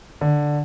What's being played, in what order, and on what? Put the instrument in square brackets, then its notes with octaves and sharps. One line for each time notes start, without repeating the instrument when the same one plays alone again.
[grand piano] D3